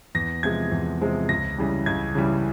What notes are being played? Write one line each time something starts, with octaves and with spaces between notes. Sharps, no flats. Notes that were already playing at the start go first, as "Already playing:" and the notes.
E2 A#6
C3 F3 G#3 G#6
E2
C3 F3 G#3
C#2 A#6
C#3 E3 G3
C#2 G#6
C#3 E3 G3